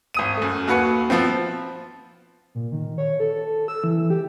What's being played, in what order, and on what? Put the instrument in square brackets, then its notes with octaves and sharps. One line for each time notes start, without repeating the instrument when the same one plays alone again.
[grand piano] G#1 D#6 D#7
F#2 A3
D#2 F#4 B4 C#7
F3 B3 C4
[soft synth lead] A#2
D#3
C#5
A4
E6
E3
G4